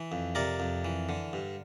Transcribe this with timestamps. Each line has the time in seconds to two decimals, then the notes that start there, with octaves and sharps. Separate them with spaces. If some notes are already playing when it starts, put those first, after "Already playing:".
Already playing: E3 E5
0.12 F2
0.35 C3 A#4 D5
0.60 F2
0.85 E3
1.09 D3
1.33 G2